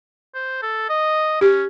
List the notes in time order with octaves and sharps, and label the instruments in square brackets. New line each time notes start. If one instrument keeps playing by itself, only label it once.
[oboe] C5
A4
D#5
[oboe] C#4 [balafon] G4